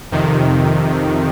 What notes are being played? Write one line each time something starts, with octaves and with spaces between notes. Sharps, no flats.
F2 C3 D#3